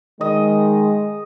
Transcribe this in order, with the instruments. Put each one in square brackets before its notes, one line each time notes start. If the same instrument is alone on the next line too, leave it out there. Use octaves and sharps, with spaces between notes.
[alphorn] D#3 [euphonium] G#3 [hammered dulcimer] D#5